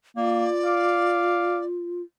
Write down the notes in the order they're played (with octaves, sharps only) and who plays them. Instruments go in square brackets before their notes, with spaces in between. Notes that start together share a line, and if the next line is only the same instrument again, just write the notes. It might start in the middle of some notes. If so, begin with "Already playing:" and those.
[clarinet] A#3 [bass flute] F4 [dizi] D5
[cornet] F5 [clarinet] D6